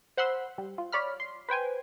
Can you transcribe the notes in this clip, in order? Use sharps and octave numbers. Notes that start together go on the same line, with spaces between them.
C5 F#5 B5 C6 E6
G3
F4
C#5 D5 B5 F6
C6
B4 C5 G5 G#5